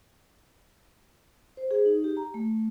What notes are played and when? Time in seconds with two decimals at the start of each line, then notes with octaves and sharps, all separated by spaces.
1.57 C5
1.71 G#4
1.85 D#4
2.04 G4
2.17 A#5
2.34 A3